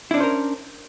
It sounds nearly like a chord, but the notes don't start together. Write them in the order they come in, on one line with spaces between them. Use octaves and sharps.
E4 D4 C#4 C5 A#4